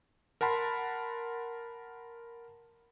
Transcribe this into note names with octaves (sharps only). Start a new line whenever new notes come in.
A#4 F#5 A5 B5 C6